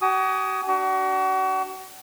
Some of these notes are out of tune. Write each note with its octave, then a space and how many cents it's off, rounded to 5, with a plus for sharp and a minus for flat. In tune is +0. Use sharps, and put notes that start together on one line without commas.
F#4 +40 G#5 +10 D#6 +0
D4 +0 F#4 +35